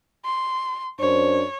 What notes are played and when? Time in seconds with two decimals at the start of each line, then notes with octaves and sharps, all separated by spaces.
0.25 C6
1.00 F#2 D4 C5 C#5